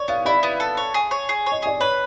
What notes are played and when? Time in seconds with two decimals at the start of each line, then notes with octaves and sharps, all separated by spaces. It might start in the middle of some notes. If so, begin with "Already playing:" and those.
Already playing: C#5 D5
0.08 B3 F5
0.25 E4 D5
0.43 B3
0.60 A4
0.77 C#5
0.94 G#4
1.11 C#5
1.29 G#4
1.46 C#5
1.52 D#5
1.62 G#4 D5
1.80 B4 C#5